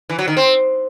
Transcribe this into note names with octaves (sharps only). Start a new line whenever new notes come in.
E3
F#3
D#3
C4